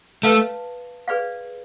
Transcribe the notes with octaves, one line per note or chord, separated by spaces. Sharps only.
A3 B4 F5 A5
G#4 B4 D5 F5